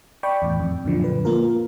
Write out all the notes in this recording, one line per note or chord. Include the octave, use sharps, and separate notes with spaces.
D5 G5 B5 C#6
E2 A2
F2
F#2 A#2 D3 F3
B4
A#3 F4 A#4